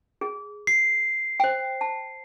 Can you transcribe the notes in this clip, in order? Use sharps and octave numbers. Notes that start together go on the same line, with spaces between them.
G#4
C7
C5 G5
A5